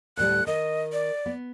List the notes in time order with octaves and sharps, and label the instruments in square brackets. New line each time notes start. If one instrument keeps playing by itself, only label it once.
[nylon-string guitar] D2 A2 G3 [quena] F#6
[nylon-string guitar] D#3 [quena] D#5
[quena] D5
[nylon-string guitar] B3